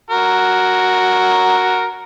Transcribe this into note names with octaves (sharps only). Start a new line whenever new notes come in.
F#4 A#4